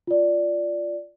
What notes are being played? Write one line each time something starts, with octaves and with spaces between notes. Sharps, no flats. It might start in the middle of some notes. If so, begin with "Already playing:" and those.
F4 D5